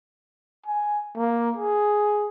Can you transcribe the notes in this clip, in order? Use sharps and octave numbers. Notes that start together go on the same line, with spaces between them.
G#5
A#3
G#4